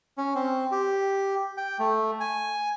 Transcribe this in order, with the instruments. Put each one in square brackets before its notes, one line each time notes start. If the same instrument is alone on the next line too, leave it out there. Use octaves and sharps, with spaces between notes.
[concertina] C#4
C4
G4
G5
A3
G#5